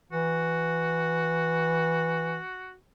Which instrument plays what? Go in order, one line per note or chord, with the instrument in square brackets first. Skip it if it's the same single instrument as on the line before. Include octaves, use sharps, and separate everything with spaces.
[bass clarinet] E3 [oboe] F#4